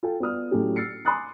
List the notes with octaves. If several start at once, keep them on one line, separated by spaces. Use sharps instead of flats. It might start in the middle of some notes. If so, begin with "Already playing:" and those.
F4 A4 G5
B3 F4 D5 D#6 F6
A2 F#3 C#4 G4 A4
E6 F6 A6 C7 C#7
G#5 C6 D6 D#6 F#6 A6